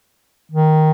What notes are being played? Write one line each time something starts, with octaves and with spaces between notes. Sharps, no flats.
D#3